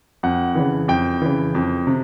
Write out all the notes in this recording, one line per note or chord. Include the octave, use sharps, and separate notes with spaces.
F2 F#5
C#3 E3
F2 G5
C#3 E3
F2
C3